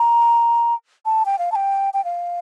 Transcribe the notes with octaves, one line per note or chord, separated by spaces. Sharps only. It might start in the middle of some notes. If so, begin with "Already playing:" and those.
Already playing: A#5
A5
G5
F5
A5
G5
G5
F5